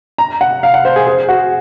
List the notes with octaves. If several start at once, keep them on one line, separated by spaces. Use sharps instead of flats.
A#5
F#5
F5
F#5
C5
G#4
G#4
F#4